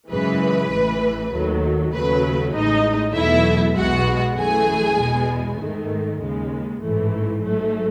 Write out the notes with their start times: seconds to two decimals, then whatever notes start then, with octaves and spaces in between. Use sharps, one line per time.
0.10 F#2 C#3 E3 G#3 B4
0.71 A1 A2 E3
1.32 D#2 D#3 F#3 A3
1.93 D#2 C#3 F#3 A3 B4
2.54 A1 A2 G#3 D#4 D#5
3.15 E2 B2 F#3 A3 E4 E5
3.77 B1 B2 G#3 F#4 F#5
4.37 F#2 E3 A3 G#4 G#5
4.98 E2 B2 G#3
5.60 G#2 D#3 A3
6.20 D#2 C#3 G#3
6.82 A1 G#2 E3 A3
7.43 G#2 F#3 A3